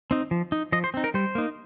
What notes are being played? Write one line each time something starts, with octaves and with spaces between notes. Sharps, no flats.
C4 D#4
F3
D#4
F3 D#5
C5
C4 D#4
A#4
G3 C5
A#3 D#4